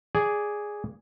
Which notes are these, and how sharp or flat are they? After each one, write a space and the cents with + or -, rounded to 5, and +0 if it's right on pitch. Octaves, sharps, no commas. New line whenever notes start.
G#4 +0 D5 -10